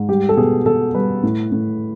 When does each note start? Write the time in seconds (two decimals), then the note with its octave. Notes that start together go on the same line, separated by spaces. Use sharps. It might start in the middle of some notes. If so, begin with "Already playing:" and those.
Already playing: G#2
0.09 G3 G4
0.29 A4
0.37 B2 G#4
0.66 B2 A4
0.94 G3 B4
1.23 A2
1.52 A2